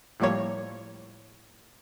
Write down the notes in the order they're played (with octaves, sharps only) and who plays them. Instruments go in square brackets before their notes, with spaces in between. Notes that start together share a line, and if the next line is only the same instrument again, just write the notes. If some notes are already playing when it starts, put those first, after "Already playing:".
[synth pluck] A2 F3 G3 A#3 C#5